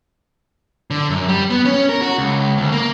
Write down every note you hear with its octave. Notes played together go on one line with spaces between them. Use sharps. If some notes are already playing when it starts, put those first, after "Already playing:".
D3
F#2
G3
B3
C#4
A#4
F#4
C#2
D2
A#3